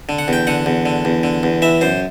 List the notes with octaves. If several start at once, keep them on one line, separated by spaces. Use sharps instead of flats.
D3
F#5
E2 G5
D3 F#5
E2
D3
E2
D3
E2
E3 E5
F#2 C5